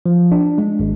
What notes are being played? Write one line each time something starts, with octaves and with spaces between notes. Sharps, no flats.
F3
D4
G#3
G#1